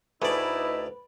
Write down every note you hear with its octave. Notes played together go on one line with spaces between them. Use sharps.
D2 A3 D#4 E4 G#4 B4 D5